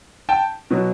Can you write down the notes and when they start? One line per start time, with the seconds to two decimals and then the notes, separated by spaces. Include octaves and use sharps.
0.29 G5 A5
0.70 B2 F#3